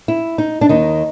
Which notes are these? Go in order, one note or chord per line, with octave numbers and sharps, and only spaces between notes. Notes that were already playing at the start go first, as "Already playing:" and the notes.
E4
D#4
D4
D#2 D#3 D#4